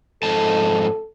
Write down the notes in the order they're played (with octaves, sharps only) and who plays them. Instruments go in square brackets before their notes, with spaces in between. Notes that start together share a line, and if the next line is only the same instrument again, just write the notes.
[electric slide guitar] F2 G#2 A5 [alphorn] A4